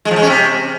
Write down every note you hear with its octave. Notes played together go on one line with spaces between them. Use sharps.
G#3
F3
G#3
C#4
C3